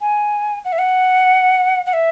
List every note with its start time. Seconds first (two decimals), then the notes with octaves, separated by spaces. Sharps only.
0.01 G#5
0.65 F#5
0.73 E5
0.79 F#5
1.86 F#5
1.93 E5